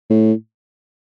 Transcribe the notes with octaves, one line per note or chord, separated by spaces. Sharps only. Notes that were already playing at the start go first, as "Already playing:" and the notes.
A2